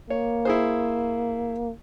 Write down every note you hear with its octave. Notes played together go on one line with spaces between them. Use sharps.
A#3 C#5
E4 G#4 C5